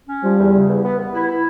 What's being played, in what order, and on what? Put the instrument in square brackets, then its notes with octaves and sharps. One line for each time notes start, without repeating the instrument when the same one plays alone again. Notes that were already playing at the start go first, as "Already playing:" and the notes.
[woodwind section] C#4
[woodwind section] F3 [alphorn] G3
[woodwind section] E2
C#3
E2
B3
B3
E4
E4